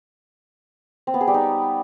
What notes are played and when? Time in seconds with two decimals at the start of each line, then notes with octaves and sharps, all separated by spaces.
1.07 C4
1.14 B3
1.21 G#4
1.27 G3
1.34 D#4